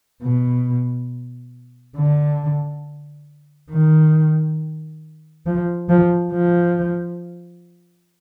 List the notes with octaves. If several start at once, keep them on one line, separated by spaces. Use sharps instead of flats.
B2
D3
D#3
F3
F3
F3